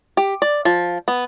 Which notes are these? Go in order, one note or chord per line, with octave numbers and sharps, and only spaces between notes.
G4
D5
F3
B3